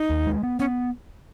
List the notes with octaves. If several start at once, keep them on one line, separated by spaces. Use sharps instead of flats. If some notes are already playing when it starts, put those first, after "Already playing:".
Already playing: D#4
D#2
G#3
B3
B3 C#4